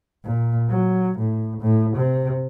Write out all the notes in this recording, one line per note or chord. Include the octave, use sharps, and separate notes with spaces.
A#2
F#3
A2
A2
C3